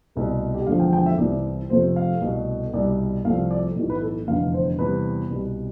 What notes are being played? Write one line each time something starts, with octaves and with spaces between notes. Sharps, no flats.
C2 B2 A3
G4
E1 E2 D3 F3 A3 F5
G5
G5
E5
C2 C3 E3 D5
F1 F2 C3 F3 A3 C5
F5
C2 B2 A3
C2 B2 G3 D5
C2 C3 F3 A3 F5
D5
B1 A2 E3
B4
A4
F1 E2 D3 F5
C5
E2 C3 G3 B4
C2 B2 G3